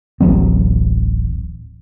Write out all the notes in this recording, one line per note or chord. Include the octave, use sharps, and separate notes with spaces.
D1 A1 F#3 C4